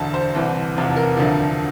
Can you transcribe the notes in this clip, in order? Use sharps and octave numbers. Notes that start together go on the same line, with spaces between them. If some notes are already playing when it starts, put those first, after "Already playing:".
Already playing: E1 D2 D3 A5
C5
C2 C3 E3
F1 E2 C3 F3
A#4
E1 D2 D3 F3